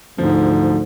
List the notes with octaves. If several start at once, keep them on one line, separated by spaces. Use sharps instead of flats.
D2 G#2 F3